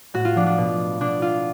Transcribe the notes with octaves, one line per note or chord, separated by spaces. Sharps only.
A2 F#4
F4
F3 D4
D4
B2
B2 D4
F4